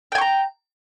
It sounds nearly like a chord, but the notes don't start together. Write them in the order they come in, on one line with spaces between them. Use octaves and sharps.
G5 G#5 C#6 A#5